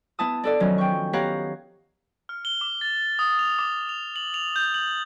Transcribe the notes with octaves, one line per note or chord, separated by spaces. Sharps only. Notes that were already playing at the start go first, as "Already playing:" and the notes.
B3 E4 A5 D#6
D4 A4 D5
D#3 F3 F#3 C#4
G5 C#6
B3 G4 C#5 F5 F#5 A#5
F6
G7
D6
A6
D#6
F7
D6
F7
F#7
F7
G6
F#7